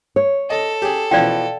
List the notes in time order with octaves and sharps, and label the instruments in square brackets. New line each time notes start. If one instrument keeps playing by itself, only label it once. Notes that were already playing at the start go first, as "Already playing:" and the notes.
[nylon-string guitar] C#5
[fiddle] A4 [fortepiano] D#5
[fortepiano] G4 G#4
[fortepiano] B2 E3 F3 [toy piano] D5 F5 G5